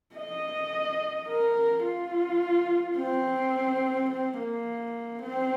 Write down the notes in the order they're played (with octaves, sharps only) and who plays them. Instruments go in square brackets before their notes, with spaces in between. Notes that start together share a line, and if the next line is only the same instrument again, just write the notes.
[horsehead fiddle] D#5
A#4
F4
C4
C4
A#3
C4